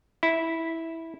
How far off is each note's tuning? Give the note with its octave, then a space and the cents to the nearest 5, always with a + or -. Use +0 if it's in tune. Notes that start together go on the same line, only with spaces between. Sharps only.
E4 -10